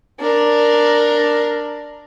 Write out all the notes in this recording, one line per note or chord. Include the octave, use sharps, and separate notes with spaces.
D4 A#4